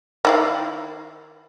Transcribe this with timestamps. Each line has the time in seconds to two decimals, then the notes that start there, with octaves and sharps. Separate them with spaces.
0.25 D#3 E4 F5